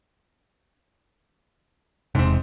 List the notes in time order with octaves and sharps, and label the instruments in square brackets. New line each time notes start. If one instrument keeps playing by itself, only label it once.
[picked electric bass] E1 C3 [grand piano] G#2 C4